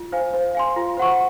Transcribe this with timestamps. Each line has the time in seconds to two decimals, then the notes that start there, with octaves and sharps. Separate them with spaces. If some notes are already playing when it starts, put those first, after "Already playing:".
Already playing: F4
0.12 C5 F5 G#5
0.34 C5
0.55 F5 G#5 C6
0.76 F4
0.97 C5 F#5 C#6